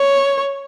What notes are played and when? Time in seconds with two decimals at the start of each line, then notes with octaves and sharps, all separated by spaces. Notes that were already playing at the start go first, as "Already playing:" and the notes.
Already playing: C#5